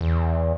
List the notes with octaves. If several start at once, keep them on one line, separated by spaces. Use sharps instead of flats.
E2